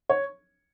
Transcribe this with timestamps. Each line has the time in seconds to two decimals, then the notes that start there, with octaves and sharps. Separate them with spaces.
0.10 C#5